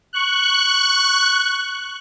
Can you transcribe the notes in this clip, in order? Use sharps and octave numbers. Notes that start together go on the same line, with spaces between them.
C#6 F#6